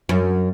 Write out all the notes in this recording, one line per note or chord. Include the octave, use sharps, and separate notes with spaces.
F#2